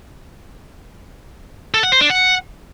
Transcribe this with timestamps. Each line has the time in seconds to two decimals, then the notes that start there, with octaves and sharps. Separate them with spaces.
1.74 A4
1.83 F#5
1.92 C5
2.01 D4
2.10 F#5